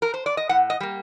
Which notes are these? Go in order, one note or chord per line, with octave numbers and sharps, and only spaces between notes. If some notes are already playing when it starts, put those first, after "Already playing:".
A#4
C5
D5
D#5
A2 F#5
D#5
G3 A#3